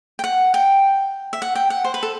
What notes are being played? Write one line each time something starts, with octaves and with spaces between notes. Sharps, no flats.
G5
F#5
G5
E5
F#5
G5
F#5
C5
B4
A4